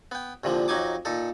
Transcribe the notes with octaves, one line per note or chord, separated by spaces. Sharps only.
B3 G5
C2 A#2 D3 F3
F2 F#3 D#4 G#5 D6
A#2 D#4 A4